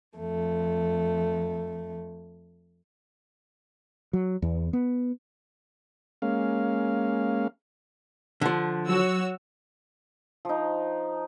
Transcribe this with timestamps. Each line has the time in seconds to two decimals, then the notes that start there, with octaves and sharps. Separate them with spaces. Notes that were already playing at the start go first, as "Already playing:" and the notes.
0.18 F2 A3
4.13 F#3
4.42 E2
4.73 B3
6.22 G#3 A#3 C#4 F5
8.41 D3 F3
8.89 F#3 F#4 C#5 E6
10.45 F3 D#4